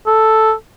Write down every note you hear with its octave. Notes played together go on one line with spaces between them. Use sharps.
A4